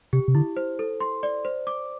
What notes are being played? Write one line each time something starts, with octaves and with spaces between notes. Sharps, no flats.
C3 G4
C3
D3 E4
C5
A4
C6
D5
C5
D6